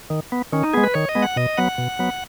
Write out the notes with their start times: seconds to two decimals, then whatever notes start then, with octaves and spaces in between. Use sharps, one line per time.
0.10 D#3
0.32 B3
0.52 D#3 C#4
0.63 D#4
0.73 G#3 B3 G#4
0.83 B4
0.94 D#3 C#5
1.09 D#5
1.15 G#3 B3
1.22 F#5
1.36 B2 D#5
1.57 F#3 B3 F#5
1.78 B2
1.99 F#3 B3